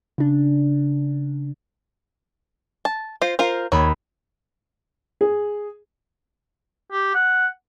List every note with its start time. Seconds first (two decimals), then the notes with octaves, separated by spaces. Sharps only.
0.18 C#3 D4
2.85 A5
3.22 F4 C5 A#6
3.39 F4 A#4 C5
3.72 D#2 C#5 B5 D#6
5.21 G#4
6.92 G4
7.14 F#5